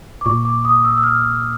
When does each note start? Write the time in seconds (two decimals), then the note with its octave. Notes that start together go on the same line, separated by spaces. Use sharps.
0.21 D6
0.26 A#2 C#6
0.45 D6
0.65 D#6
0.84 E6
0.97 E6
1.03 F6